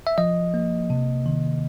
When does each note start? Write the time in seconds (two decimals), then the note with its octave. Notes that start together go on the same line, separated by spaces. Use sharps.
0.07 E5
0.18 F3 D#5
0.54 A#3
0.90 C3
1.26 D#3